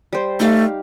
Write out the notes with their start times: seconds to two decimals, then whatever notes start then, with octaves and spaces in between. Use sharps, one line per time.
0.13 G3 C5
0.40 A3 D#4 G4 F5